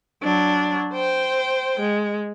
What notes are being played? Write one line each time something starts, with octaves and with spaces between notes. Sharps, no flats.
F#3 D4
C5 G5
G#3